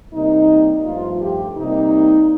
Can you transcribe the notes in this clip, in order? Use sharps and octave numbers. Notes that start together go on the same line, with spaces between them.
C3 G3 A#3 D#4
G2 F3 A3 F4
G4
C3 G3 A#3 D#4